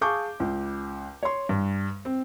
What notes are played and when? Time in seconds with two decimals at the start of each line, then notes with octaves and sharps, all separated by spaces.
0.01 G#4 F5 A5 C#6 D6 G6
0.40 C#2
1.23 C#5 C6
1.49 G2
2.05 C4